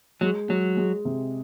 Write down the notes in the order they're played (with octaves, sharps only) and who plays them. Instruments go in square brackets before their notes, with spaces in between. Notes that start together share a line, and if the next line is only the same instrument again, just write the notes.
[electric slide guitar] F#3 [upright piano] G#3
[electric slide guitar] F#3 [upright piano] G#3
[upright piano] G#3
C3